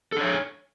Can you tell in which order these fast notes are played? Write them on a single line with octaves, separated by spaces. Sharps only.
A4 D4 C#5